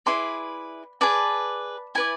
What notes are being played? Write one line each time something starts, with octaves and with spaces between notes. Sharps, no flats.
E4 G#4 B4 D5 C6
G#4 B4 D5 A5
E4 B4 D5 G#5